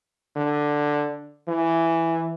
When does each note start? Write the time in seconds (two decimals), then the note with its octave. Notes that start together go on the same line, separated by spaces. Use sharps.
0.36 D3
1.48 E3